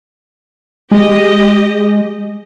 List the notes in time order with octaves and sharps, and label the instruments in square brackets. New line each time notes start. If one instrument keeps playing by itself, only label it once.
[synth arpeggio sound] G#3 [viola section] G4 D#5